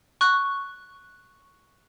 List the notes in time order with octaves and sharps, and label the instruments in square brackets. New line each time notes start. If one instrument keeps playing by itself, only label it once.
[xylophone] C#6 F#6